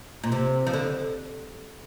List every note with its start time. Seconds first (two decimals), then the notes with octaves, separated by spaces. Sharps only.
0.24 A#2
0.32 C3
0.67 F3
0.73 D3